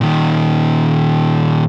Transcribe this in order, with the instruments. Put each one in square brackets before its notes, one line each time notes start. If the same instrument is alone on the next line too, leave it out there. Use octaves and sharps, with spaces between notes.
[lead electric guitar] A#2 D#3